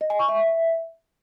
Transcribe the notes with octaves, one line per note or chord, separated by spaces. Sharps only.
D#5
G#5
C#6
E5